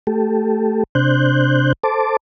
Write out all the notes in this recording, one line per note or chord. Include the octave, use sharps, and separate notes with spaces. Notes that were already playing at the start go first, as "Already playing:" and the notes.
A3 G4 A4
C3 D4 C5 F#6 G6
A4 C5 A5 D6